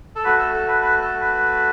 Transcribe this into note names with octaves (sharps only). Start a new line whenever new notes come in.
A4
A3 F#4 B4
A4
A4
B4
B4
A4
B4